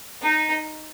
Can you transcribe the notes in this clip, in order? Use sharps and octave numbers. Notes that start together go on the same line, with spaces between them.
D#4